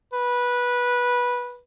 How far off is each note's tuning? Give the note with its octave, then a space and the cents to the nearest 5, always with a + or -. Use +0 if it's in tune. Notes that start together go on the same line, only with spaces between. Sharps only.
B4 -15